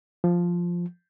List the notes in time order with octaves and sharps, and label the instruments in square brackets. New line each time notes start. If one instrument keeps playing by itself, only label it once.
[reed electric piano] F3